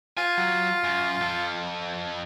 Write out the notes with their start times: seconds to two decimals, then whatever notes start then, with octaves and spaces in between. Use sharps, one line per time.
0.17 F4 G#5
0.37 F#3
0.84 F#2
1.21 F2 A4